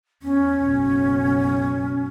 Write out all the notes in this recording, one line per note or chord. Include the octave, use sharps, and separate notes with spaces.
E2 C#4
F#1 B1